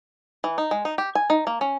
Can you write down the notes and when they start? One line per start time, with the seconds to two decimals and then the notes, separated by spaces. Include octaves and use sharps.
0.44 E3
0.58 D#4
0.71 G#3
0.85 D#4
0.98 G4
1.15 G#5
1.30 D#4
1.47 A#3
1.61 C#4